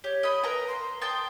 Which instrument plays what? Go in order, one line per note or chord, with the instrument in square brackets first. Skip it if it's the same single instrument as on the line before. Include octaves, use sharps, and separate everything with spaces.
[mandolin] G4 [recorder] C#5
[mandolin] D#5 B5
[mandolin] A#4 A#5 [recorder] B4
[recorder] C6
[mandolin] G5 A5 C6 [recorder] D#6